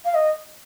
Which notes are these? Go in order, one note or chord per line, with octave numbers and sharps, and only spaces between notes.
F5
D#5